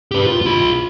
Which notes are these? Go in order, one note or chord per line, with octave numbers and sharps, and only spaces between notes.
G4 B4
F4
F4 B5